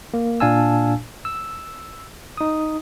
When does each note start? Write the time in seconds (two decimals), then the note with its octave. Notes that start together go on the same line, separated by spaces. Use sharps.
0.14 A#3
0.40 A#2 D4 F5 G#5 A5 E6
1.25 E6
2.37 D#4 D#6